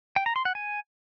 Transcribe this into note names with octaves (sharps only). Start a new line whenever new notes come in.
G5
A#5
C6
F#5
G#5